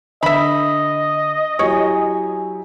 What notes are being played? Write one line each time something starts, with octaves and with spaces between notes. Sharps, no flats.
D3 D#5 E5 B5
F#3 E4 G4 C#5 G#5